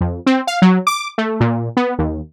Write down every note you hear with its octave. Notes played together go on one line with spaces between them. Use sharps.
F2
C4
F5
F#3
D6
A3
A#2
B3
D#2